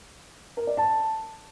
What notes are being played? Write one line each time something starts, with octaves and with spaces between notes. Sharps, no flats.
A#4
D5
A5